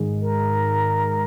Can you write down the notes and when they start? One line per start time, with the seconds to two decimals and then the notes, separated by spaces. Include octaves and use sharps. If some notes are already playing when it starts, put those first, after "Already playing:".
Already playing: G#2 D#3 G#3
0.21 A#4